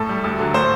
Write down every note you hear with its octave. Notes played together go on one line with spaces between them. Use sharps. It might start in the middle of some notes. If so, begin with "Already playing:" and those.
Already playing: A2 A4
G3
D2
D3 F#3
A2 C5